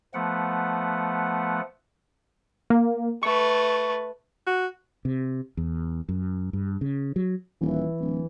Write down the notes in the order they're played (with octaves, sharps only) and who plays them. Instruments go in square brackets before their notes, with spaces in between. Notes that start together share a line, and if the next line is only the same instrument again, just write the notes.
[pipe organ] F3 A3 B3 F#5
[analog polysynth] A#3
[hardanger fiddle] A3 B4 [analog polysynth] C#6
[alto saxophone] F#4
[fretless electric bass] C3
E2
F#2
G2
C#3
F#3
[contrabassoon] D#1 [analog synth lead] E3
[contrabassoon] D1